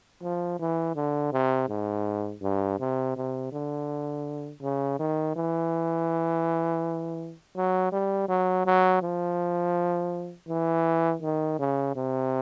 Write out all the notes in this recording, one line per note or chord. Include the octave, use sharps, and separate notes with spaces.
F3
E3
D3
C3
G#2
G2
C3
C3
D3
C#3
D#3
E3
F#3
G3
F#3
F#3
F3
E3
D#3
C#3
C3